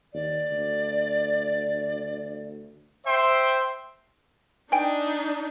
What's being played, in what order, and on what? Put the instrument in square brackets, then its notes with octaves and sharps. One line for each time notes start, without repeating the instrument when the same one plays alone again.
[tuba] D#2 [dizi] D5
[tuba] D2
[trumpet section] C5 E5 G5 C6
[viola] D4 D#4 [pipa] G5 G#5